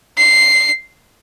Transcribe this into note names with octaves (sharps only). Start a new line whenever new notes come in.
C7